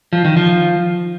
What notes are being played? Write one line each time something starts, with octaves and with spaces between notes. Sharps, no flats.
F3
D#3
F3